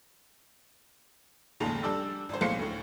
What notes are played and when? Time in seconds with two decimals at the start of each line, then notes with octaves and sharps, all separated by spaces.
1.60 F1 D#2 G#2 C#3 A5 F7
1.83 G3 D4 A4 D5 A5 E6
2.29 G#1 C5
2.41 B1 A2 G#3 A#3 C5 C#7
2.59 D2 A2